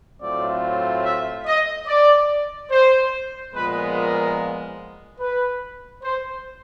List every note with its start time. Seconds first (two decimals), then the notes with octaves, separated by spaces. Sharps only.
0.21 A2 F#3 A3 C4 F4 D5
1.04 E5
1.46 D#5
1.87 D5
2.70 C5
3.53 A#2 F3 G#3 B3 B4
3.95 A#4
5.19 B4
6.03 C5